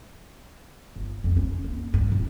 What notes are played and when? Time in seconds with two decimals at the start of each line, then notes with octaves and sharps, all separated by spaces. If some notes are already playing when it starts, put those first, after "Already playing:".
0.96 G1
1.24 F2
1.37 C#4
1.64 A#3
1.94 G2
2.12 D#1